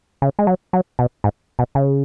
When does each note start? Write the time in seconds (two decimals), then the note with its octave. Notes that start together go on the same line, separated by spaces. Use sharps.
0.22 C#3
0.39 G#3
0.47 F#3
0.73 F#3
0.99 B2
1.24 G#2
1.59 B2
1.75 C#3